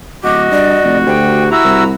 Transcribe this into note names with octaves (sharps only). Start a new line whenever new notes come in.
D1 F#4 D#5 D6
G2 D5
F1
D2 G4 G5
E4 F#4 A#5 E6
C2